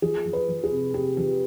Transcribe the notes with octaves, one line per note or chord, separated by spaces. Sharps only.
F3 G#4
F3
B4
F3
G#4
C3
C3 G4
F3 G4